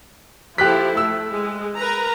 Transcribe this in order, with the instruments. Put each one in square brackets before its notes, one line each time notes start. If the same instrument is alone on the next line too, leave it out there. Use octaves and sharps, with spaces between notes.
[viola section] F3 E4 A4 [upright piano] G4 F#6 B6
[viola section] A3 [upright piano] E6
[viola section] G#3
A#4 B4 A#5